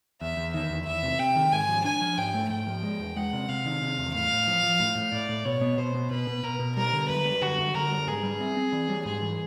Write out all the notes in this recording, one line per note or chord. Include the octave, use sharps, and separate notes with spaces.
E2 E5
E2
D#3 E5
E2
E2 E5
C3
C3 G5
D#3
G#2 G#5
F3
D4 G#5
F3
G#2 G5
A3
G#2 G5
F3
G#3
E2
G#3 F#5
C3
C3 F5
D#3
C3
E2
A2 F5
A2
F3
F3
A2
A2
A2 D5
A2
B2 C#5
B3
B2 C5
B3
B2 B4
B2
B2 A#4
B2
G3 A#4
D3
F#2 B4
G3
D3 F#4
F#2
D3 A#4
G3
G#2 G#4
G3
C4
C4
E3
G3
G#2 G#4
E3